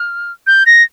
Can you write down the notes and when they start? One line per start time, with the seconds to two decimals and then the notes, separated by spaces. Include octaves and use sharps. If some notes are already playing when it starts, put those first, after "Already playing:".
Already playing: F6
0.47 G6
0.66 A#6